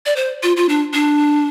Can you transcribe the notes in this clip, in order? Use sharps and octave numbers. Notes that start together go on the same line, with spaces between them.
D5
C5
F4
F4
D4
D4